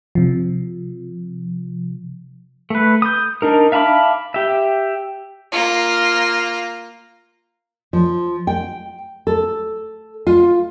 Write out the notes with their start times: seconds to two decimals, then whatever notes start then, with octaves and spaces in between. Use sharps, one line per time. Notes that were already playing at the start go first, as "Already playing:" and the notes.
0.15 C3 F3
2.70 A3 B4
3.02 D#6 G6
3.42 D4 D#4 A#4
3.72 E5 F5 A5 B5 D6
4.34 G4 E5
5.52 A#3 F4
7.93 F3
8.47 G5
9.27 A4
10.27 F4